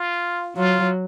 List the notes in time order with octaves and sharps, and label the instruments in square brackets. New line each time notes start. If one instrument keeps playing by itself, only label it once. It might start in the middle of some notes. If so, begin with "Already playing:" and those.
Already playing: [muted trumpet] F4
[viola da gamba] F#3 [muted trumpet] F4